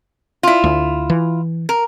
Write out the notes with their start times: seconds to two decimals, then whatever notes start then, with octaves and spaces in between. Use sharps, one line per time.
0.43 E4 F4
0.64 D2
1.10 E3
1.69 A#4